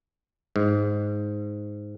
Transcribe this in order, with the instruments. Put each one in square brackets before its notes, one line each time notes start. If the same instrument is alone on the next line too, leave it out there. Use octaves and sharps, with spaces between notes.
[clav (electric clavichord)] G#2